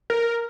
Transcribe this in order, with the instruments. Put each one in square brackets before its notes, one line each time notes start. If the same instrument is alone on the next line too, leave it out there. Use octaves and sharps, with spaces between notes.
[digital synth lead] A#4